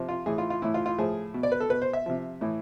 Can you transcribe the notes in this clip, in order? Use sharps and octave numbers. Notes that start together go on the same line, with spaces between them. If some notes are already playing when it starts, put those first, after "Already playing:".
Already playing: C3 F3
F4
A2 E3 G#4
F4
F4
A2 E3 E4
F4
F4
A2 F3 G#4
B2
D5
B4
A4
B2 B4
C5
E5
C3 F3
A2 E3